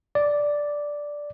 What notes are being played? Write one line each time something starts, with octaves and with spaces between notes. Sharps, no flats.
D5